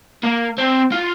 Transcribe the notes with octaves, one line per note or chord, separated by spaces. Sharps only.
A#3
C4
F4